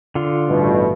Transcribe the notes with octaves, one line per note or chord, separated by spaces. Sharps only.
D3 F4
A1 G2 B2